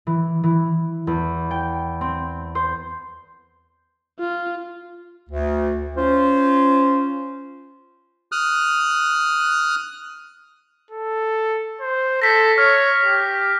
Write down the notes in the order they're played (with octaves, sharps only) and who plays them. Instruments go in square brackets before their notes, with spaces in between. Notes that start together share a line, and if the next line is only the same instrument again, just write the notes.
[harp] E3
E3
E2
G5
C4
C5
[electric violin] F4
[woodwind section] D2
C#4 F4 C5
[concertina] D#6 F6 F#6
[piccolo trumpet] A4
C5
[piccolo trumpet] A4 [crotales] A#6 B6
[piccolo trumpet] C#5 [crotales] F6
[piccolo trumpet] G4